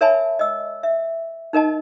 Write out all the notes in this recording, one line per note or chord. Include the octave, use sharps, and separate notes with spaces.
A#4 C#5 E5 G#5 A5 B5
D#5 E6
E5
D#4 A#4 D#5 A5